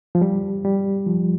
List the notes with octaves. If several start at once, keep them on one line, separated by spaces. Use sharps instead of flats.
F3
G3
G3
F3